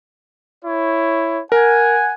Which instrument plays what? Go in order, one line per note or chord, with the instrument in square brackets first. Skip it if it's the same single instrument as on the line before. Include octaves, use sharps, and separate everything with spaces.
[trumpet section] E4 C#5
[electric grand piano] A#4 [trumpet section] F#5 G#5